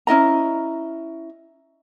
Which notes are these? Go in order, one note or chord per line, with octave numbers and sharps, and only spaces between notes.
C#4 E4 D#5 A#5